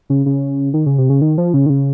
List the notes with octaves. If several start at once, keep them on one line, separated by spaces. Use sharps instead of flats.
C#3
C#3
D#3
C#3
C3
C#3
D#3
F3
C#3
D#3
C#3